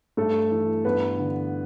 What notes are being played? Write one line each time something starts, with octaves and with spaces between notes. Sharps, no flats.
G2 A3 A4
E3
G2 B3 B4
D3